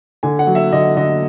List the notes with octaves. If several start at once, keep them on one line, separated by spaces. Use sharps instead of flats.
D3 G#5
F#5
F#3
E5
D3 D#5
D3 D#5